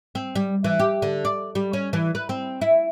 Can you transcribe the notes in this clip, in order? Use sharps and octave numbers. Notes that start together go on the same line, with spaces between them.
C4
G3
E3
G4
D3
D5
G3
C#4
E3
B4
C4
E4